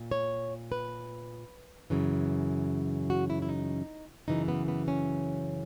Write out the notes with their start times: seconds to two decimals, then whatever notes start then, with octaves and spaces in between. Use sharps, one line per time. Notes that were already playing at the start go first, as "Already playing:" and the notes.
Already playing: A#2
0.11 C#5
0.72 B4
1.90 F#2 C#3 E3
3.10 F#4
3.30 E4
3.42 E4
3.49 D#4
4.28 F#2 C#3 E3 D#4
4.48 B3
4.68 B3
4.88 C#4